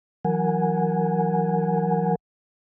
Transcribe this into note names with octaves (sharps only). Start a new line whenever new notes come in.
E3 F#3 A#4 F#5 G#5